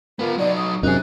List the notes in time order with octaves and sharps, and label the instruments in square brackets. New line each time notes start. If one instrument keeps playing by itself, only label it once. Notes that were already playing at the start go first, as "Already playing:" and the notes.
[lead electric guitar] B3 F4 [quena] A#4
[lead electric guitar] F#3 D#4 [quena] D5
[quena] D#6
[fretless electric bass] F#2 C3 [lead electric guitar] D#4 G#4 [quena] F#6